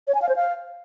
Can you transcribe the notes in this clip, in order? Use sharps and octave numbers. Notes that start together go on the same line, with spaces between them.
C#5
G#5
F5
C5
F5